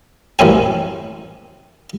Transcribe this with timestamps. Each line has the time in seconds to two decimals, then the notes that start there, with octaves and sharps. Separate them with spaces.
0.39 A1 F#2 C4 G#5